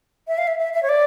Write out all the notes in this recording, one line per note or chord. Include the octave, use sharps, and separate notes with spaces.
E5
F5
E5
E5
E5
C#5
D5